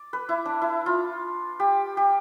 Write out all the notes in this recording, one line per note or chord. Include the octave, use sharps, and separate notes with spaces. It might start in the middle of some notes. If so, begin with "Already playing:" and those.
Already playing: D5
B4
E4
D4
E4
F4
G4
G4